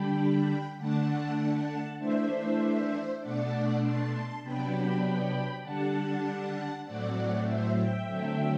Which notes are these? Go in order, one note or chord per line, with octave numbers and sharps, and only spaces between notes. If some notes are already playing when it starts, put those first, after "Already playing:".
Already playing: D3 G3 D4 G5 B5
D3 A3 D4 F#5 A5
E3 A3 D4 C5 E5
B2 A3 D4 D5 F#5
A5 C6
C3 F#3 B3 D4 G5 B5
D3 G3 D4 F#5 A5
A2 F#3 A3 C4 D5 F#5
C5 E5
E5 G5
D3 F#3 A3 C4